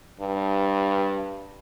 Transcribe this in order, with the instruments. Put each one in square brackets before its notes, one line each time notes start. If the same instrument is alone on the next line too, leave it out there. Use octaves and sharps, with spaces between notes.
[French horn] G2